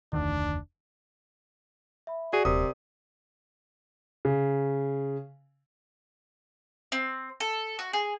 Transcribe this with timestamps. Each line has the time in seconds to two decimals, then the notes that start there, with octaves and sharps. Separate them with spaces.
0.13 F1 D2 D#3 D4
2.07 E5 B5
2.33 F#4 G#4 D5
2.45 D#1 C3 A#4 D5 D#6
4.25 C#3
6.92 C4
7.40 A4
7.79 F#4
7.93 G#4